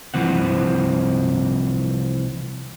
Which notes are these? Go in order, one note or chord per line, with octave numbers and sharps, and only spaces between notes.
C2 E3 F3 C4 F#5